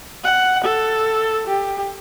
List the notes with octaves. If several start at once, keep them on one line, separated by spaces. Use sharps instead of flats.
F#5
A4
G4